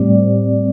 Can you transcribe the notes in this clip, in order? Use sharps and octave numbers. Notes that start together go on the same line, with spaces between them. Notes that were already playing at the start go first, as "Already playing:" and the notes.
Already playing: A2 G3 C4 D5